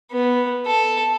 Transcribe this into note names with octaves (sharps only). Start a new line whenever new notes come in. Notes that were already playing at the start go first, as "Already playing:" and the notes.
B3
A4